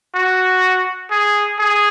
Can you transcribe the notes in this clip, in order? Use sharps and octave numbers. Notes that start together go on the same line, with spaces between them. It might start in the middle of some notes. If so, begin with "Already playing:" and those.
F#4
G#4
G#4